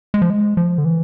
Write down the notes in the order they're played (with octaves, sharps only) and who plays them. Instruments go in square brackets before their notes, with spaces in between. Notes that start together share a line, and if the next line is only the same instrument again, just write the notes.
[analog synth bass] G#3
F3
G#3
F3
D3
E3